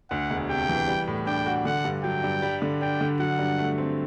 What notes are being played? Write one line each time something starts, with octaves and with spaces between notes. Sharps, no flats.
D2 F#5
E1
C3 G5
E3
G3
A2
D4 G5
F#4
D3 F#5
G2
F#3 G5
G2
G3
D3
D4 G5
D3
F#3 F#5
G2
A3
C4